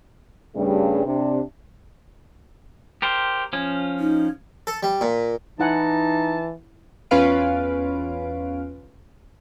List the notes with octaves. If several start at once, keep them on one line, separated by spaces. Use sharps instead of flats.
G2 C#3 G3 A3 G#4
C3 D4
G4 A#4 C5
F3 C#4
D#4
A4
G3
A#2
E3 D#4 E4 F#5 G#5 A5
E2 C#4 F4 B4 F5 D7